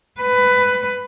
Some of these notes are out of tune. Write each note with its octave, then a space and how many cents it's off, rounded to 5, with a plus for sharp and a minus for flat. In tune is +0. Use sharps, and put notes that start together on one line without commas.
B4 +15